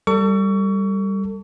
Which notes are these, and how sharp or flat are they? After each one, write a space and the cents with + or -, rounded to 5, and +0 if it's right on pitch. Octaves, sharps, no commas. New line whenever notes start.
G3 +0 A4 +35 C#6 +30